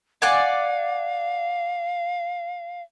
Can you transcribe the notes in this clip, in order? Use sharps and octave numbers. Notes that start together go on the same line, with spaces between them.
D5 F5 F#5 G#5